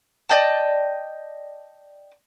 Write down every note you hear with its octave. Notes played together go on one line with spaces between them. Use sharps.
D5 D#5 G5 A5